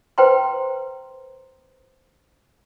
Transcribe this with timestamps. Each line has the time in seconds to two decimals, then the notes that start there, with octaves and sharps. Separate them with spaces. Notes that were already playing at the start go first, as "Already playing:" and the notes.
0.18 B4 C5 G5 A#5 C6